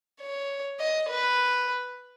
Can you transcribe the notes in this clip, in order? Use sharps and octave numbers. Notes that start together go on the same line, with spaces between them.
C#5
D#5
B4